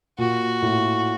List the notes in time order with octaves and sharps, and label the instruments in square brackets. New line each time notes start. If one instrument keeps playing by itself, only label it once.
[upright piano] A#2 [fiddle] F#4
[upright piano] A2